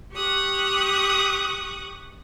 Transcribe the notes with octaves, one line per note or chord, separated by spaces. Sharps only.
G4 C#6 D#6 F#6